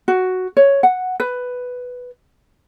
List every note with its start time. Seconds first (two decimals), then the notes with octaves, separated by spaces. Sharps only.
0.08 F#4
0.57 C#5
0.83 F#5
1.20 B4